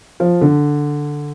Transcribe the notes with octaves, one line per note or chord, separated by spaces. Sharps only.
F3
D3